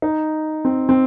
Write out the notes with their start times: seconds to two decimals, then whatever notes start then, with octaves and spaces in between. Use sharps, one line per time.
0.02 D#4
0.65 C4
0.89 C4